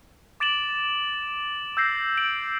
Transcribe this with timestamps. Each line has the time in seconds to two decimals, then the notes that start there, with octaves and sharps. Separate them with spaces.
0.40 D6 A6 D7 E7 F#7
1.77 E6 G6 A#6 C7
2.17 D7 F#7